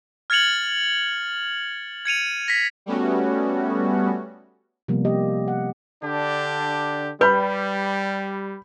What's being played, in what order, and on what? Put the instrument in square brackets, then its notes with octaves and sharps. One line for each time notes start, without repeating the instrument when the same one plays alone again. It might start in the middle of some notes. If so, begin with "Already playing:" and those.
[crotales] F6 G#6 A6 C#7 F7 F#7
G#6 C#7 D#7 F7
A#6 B6
[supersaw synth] G3 A3 B3 C#4 F#4
[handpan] C3 F3 G3 A#3 B3
A#3 G4 D#5
F#5
[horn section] D3 D4 G4
[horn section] G3 [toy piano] B4 [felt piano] B5 G6